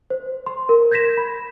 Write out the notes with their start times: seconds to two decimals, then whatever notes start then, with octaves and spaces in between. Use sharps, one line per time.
0.10 C5
0.46 C6
0.69 A#4
0.91 G6 G#6 A#6 B6 E7
1.17 B5